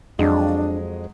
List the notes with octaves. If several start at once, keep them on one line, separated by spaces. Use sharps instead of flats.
F2 F#3 G#3 D4 D#5